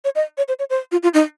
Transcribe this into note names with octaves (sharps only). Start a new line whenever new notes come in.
C#5
D#5
C#5
C5
C#5
C5
F4
F4
D#4